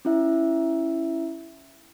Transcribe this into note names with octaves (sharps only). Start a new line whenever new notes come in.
C#4 E4 E5